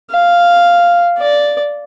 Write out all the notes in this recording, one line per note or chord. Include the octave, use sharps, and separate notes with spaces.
F5
D5